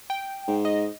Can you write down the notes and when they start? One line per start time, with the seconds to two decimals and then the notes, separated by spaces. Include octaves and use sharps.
0.10 G5
0.48 G#2
0.65 D#5